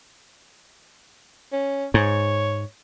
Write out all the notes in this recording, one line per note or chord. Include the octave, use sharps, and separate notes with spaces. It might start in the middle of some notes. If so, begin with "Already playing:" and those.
C#4
G#2 C#5